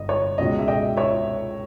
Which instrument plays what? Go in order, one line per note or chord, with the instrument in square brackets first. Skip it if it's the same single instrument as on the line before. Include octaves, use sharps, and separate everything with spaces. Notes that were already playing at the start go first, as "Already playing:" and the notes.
Already playing: [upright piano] G1 D#5
C#5
C#2 B2 G#3 D#5
E5
D#5 G5
C#5 E5